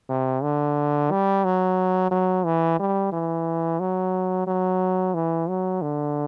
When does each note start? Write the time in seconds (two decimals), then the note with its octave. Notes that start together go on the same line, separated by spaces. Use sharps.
0.09 C3
0.43 D3
1.11 G3
1.45 F#3
2.11 F#3
2.45 E3
2.79 G3
3.13 E3
3.80 F#3
4.47 F#3
5.14 E3
5.49 F#3
5.82 D3